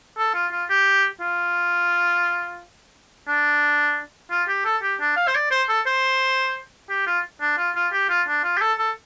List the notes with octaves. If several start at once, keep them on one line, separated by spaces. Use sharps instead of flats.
A4
F4
F4
G4
F4
D4
F4
G4
A4
G4
D4
F5
C5
D5
C5
A4
C5
G4
F4
D4
F4
F4
G4
F4
D4
F4
G4
A4
A4